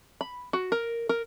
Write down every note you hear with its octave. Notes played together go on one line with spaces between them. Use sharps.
B5
F#4
A#4
A#4